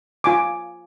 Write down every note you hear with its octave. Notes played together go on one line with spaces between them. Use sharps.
F4 G#5 D6